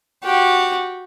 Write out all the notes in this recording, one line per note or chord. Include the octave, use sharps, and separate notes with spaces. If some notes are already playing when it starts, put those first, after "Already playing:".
F#4 G4